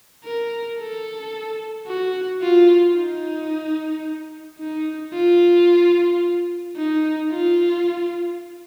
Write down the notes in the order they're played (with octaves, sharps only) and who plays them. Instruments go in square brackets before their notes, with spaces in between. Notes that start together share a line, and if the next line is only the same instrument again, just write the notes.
[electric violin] A#4
A4
F#4
F4
D#4
D#4
F4
D#4
F4